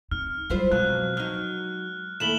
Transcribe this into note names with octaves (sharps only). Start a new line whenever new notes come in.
C4 D#4 F6
F#3 G3 E4 F4 C5
F2 B2 F#3 G#3 F#6
F#3 D#4 F6
D#2 A3 E4 E7 F#7 G7